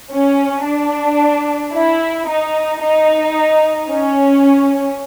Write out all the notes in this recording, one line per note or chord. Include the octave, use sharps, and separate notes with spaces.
C#4
D4
E4
D#4
D#4
C#4